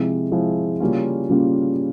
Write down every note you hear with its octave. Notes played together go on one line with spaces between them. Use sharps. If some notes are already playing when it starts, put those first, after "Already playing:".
Already playing: C3 F3 G#3 E4
C3 F3 G#3 E4
C#3 G3 A#3 C#4 F4
C#3 G3 A#3 C#4 F4